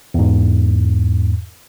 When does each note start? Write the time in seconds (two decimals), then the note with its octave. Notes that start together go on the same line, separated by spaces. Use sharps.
0.14 E2 G#2